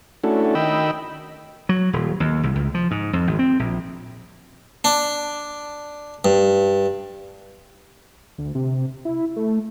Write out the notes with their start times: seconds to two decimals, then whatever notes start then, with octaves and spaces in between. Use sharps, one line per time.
0.24 A3 C#4 D4 E4 F#4 A4
0.55 D#3 D#5 G5 B5 E6
1.69 F#3
1.93 D#1
2.20 D#2
2.43 C2
2.55 C#2
2.74 F3
2.91 G#2
3.13 F2
3.27 G#1
3.39 C4
3.59 A#1
4.84 D4
6.25 G2
8.38 D2
8.55 C3
9.05 E4
9.36 A3